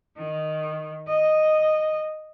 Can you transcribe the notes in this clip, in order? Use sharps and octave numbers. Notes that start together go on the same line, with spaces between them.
D#3
D#5